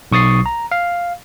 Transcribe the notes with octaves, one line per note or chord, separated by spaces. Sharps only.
B1 C#6 D#6 A6 C7
A#5
F5